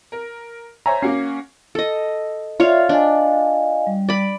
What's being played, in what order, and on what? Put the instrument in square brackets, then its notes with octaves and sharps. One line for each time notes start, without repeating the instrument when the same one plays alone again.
[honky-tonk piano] A#4
[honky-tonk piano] C5 C#5 E5 [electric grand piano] G#5 A#5
[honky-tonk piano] A#3 F#4 C7 [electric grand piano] C#4
[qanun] A4 D#5
[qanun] F4 C#5 F5 [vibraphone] D5 E5
[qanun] D4 [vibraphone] D#5 F5 G#5
[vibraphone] G3
[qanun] D5 B5